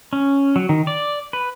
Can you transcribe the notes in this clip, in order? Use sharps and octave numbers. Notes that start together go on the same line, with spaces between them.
C#4
F#3
D#3
D5
B4